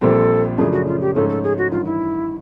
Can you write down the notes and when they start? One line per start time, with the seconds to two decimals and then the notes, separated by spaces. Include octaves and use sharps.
0.01 A#1 A#2 G3 C4 A4
0.58 F#2 C#3 F3 A3 D4 G#4
0.72 F#4
0.87 F4
1.01 G4
1.15 G#2 F3 A3 C#4 F4 A4
1.29 A4
1.43 G#4
1.58 F#4
1.71 A1 G2 D#3 F4
1.85 E4